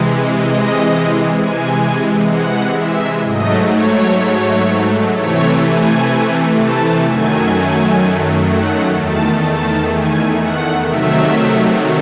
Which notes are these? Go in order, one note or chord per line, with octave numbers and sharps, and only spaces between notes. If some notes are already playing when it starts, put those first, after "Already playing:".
Already playing: C3 E3 G#3
D#5
C3 E3 G#3 G#5
F#5
E5
G#2 F#3 A3 D#5
C#5
C3 E3 A3 C#5
G#5
A5
F#2 D#3 F#3 A3 G#5
F#5
E2 D#3 A3 A5
A5
G#5
F#5
C3 D#3 F#3 A3 E5